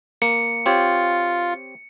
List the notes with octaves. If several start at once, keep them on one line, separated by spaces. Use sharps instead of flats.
A#3 C#7
C4 F4 G4 C#5